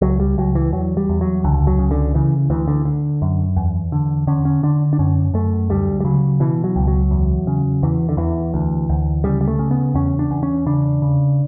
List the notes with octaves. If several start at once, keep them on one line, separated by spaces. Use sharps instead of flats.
C#2 F#3
G3
C#2 F#3
E3
E2 F#3
G3
E2
F#3
C#2 D3
F#3
C#3
D3
C#3 E3
D2 E3
D3
D3
F#2
E2
D3
D3 C#4
C#4
D3 D4
D4
F#2 C#4
F#2 A3
D2 G3
G3
C#3 F#3
B2 E3
F#3
C#2
F#3
E2
C#3
E2 E3
D3
E2 E3
D2
D2
C#3 G3
G3
A3
C#3
B3
E2 C#4
D4
E2
C#4
C#3 D4
C#3